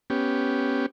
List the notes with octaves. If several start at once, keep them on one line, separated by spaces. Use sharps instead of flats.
B3 C#4 G4